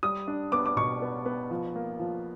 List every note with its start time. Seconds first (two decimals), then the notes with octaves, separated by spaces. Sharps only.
0.03 G3 D#6
0.28 D4
0.52 B3 D6
0.66 D6
0.76 B2 C#6
1.02 B3
1.26 B3
1.51 F3
1.76 A#3
2.00 F3